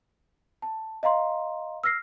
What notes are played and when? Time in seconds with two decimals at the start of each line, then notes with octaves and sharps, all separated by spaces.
0.62 A5
1.03 D#5 F5 A#5 C6
1.84 E6 F6 A#6 C7